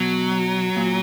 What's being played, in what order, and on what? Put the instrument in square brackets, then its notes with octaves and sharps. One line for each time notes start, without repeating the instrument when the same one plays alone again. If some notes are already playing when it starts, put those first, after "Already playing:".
Already playing: [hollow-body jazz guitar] B2 [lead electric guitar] F#3
[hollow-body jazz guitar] A#2